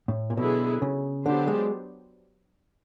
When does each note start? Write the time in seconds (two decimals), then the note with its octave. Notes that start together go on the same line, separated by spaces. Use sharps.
0.08 A2
0.30 A#2
0.37 B2 D3 F#3 B3 E4 G#4
0.82 C#3
1.26 D3 F#3 B3 D4 G4 C5
1.48 G#3